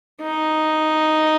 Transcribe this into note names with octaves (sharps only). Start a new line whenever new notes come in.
D#4